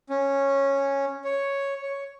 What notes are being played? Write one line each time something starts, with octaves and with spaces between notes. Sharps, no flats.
C#4
C#5
C#5